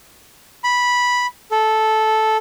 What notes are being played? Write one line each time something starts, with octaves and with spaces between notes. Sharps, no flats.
B5
A4